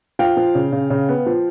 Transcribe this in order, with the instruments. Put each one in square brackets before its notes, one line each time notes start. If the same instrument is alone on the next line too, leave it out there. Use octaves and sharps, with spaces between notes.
[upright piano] F3 F5 G5
F3
C#3
C#3
C#3
B3
F3